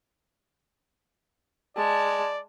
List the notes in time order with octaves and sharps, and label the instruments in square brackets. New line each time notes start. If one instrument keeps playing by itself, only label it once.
[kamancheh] G#3 A5 [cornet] D5